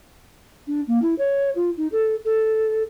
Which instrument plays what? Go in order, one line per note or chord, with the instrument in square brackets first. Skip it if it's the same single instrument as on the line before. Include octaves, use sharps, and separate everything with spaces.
[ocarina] D4
A#3
E4
C#5
F4
D#4
A4
A4